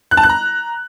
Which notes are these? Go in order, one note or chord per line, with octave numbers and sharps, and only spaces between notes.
F#6
A5
F#6
A#5